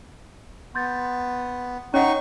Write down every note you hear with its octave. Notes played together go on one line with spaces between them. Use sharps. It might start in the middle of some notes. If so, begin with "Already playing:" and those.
B3 C6 G6 A6
C#4 D#4 C#5 F#5 C#6